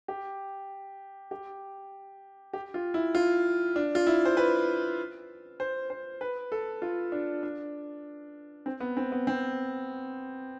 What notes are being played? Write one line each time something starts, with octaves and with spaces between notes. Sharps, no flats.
G4
G4
G4
F4
E4
F4
D4
F4
E4
C5
B4
C5
C5
B4
A4
F4
D4
D4
C4
B3
C4
B3
C4